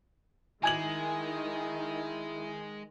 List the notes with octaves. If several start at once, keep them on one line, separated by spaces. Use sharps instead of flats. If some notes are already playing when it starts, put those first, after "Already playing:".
D#3 G#3 E4 G#5 G#6 F#7